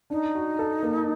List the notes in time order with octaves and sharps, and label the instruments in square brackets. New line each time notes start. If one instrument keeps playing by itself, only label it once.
[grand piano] D4 [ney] D#4
[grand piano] F#4
A4
A#3